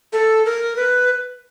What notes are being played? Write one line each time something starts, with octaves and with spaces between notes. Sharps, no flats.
A4
A#4
B4